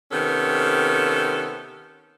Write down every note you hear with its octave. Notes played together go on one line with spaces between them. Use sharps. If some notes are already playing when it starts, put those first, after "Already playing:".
C3 D#3 B3 C#4 A4